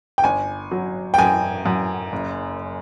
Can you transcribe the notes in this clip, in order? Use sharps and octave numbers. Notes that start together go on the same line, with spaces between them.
G5
G1 G#5
F#3
G5
F#2 G#5
F#2
F#1